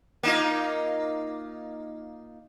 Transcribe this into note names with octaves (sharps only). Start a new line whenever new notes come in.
A#3 D#4 F4